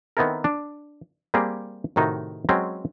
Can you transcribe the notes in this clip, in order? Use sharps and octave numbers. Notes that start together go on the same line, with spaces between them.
D#3 B3 C4 E4 A4 A#4
D4
G3 A#3 C4 G4 G#4
A2 C3 D#3 D#4 F#4
F#3 G#3 C4 C#4 B4